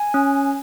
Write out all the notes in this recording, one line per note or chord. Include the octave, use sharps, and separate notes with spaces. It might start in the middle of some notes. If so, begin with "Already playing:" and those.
Already playing: G#5
C#4